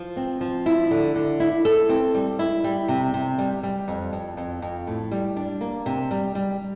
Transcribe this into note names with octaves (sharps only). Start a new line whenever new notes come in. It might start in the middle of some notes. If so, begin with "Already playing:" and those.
Already playing: F3
C4
F3
E4
D3
D3
E4
A4
C4
G3
E4
G3
C3
C3
G3
G3
F2
F2
F2
F2
A2
G3
D4
A#3
C3
G3
G3